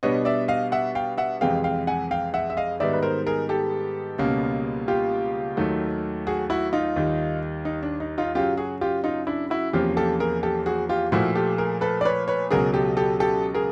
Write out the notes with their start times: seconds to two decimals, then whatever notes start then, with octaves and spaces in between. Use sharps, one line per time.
0.03 B2 G3 B3 D4 C#5 D#5
0.25 D5 E5
0.48 D#5 F5
0.72 E5 F#5
0.95 F5 G5
1.18 E5 F#5
1.41 F2 C3 E3 G#3 F5 G5
1.64 F5 G5
1.87 F#5 G#5
2.11 F5 G5
2.34 E5 F#5
2.50 E5
2.57 D#5 F5
2.80 G#2 D#3 G3 B3 D5 E5
2.93 B4
3.03 A#4 C5
3.27 G#4 A#4
3.49 G4 A4
4.18 C#2 B2 G3 A#3 C#4
4.88 F4 G4
5.57 D#2 D#3 F#3 A3
6.27 F#4 G#4
6.50 E4 F#4
6.73 D#4 F4
6.96 D#2 D#3 G3
7.65 D#4
7.83 D4
8.00 D#4
8.18 D#4 F4
8.35 F#2 C#3 F#3 F4 G4
8.57 F#4 G#4
8.81 F4 G4
9.04 D#4 F4
9.27 D4 E4
9.50 E4 F#4
9.73 E2 C3 F3 A#3 C#4 F4 G4
9.97 G4 A4
10.20 G#4 A#4
10.43 G4 A4
10.66 F#4 G#4
10.89 F4 G4
11.12 A#2 F3 A3 E4 F#4
11.35 G4 A4
11.58 G#4 A#4
11.81 A4 B4
12.01 D5
12.05 B4 C#5
12.28 B4 C#5
12.51 C#2 B2 F#3 G#4 A#4
12.74 G4 A4
12.97 G4 A4
13.20 G4 A4
13.54 G#4 A#4